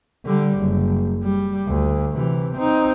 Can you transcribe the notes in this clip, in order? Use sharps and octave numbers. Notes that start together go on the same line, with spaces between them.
D3 G3
F#1
G3
D2
C3 E3
C4 D#4